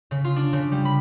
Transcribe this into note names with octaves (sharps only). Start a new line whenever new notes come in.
C#3
F4
D4
C#3
G3
B5